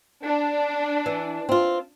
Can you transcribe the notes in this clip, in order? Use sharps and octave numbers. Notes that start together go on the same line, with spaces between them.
D4
E3
C4 F4